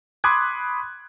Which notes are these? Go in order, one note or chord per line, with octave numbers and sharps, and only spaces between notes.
B5 C6 D6 D#6 F#6 G#6